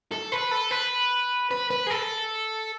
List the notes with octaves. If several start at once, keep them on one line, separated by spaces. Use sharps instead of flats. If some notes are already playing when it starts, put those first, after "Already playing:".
A4
B4
A4
B4
B4
B4
G#4
A4